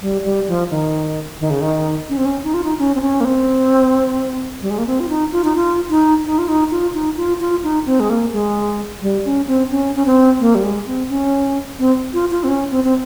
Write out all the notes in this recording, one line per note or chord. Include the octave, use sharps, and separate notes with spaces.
G3
G3
F3
D#3
D#3
C#3
D#3
C#4
C4
C#4
D#4
F4
D#4
C#4
C4
C#4
A#3
C4
G3
G#3
A#3
C4
F4
D#4
F4
D#4
F4
D#4
D#4
F4
D#4
F4
D#4
F4
F4
D#4
C4
G#3
A#3
G#3
G3
C#4
C4
C#4
C#4
C4
A#3
G3
G#3
C4
C#4
C4
F4
F4
C4
C#4
C4
C4